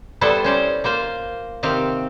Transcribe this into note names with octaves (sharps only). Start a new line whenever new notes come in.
G3 B3 E4 A4 C5
C#4 C5 D5
A#3 F4 C5 F5
C3 D#3 C4 G4 F5